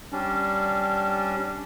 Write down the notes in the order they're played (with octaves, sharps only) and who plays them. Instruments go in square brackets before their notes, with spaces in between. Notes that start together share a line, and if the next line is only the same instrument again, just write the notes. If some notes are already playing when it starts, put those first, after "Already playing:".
[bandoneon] G3 C#4 D4